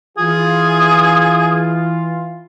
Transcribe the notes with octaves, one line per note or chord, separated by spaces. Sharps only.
E3 F4 G#4